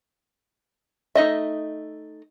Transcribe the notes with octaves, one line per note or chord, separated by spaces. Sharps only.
A3 D#4 D#5 E5